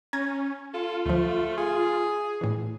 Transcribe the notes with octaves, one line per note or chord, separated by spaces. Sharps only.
C#4 A#5 G#6 D#7
F4 A4
D2 F3 A3
G#4
A2 E3